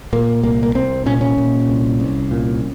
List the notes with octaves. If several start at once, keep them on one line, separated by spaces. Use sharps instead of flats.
A#2 A#3
C2 A#3
A#3
C2 C4
A#2 C#4
C#4
A#2
C2
C2
A#2